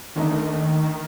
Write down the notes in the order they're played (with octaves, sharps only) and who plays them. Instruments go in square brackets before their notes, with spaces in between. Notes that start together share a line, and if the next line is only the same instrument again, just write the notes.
[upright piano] D#2 D3 A3 D#4 [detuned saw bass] D#3